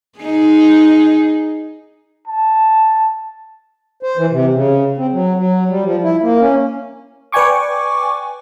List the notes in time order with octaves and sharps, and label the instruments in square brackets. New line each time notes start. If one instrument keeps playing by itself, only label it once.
[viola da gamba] D#4 G#4
[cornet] A5
[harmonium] C5
E3
C3
C#3
C4
F#3
F#3
G3
F3
E4
A#3
C#4
[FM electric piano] B4 D5 G5 G#5 C#6 D6